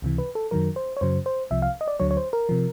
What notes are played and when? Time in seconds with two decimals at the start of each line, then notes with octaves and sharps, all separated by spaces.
0.02 C#2 C3 E3
0.18 B4
0.35 A4
0.51 F#2 D#3 F#3 A#4
0.76 C5
0.97 C#5
1.01 F#2 C#3 F#3 C5
1.26 C5
1.51 C2 C3 F3 E5
1.62 F5
1.81 D#5
1.88 D5
2.00 D2 D3 F#3 C#5
2.11 C#5
2.17 C5
2.33 A#4
2.49 C3 F3